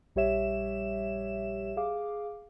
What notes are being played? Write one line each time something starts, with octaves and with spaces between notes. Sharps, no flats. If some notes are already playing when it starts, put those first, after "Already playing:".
A#1 G3 G4 C#5 E5 E7
G#4 F5 D6